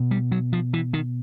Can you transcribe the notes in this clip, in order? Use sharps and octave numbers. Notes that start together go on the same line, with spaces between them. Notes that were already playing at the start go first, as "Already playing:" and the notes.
Already playing: B2
G3
F#3
F3
E3
D#3